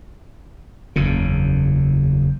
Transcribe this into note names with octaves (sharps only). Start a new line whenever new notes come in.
F#1 E2 C#3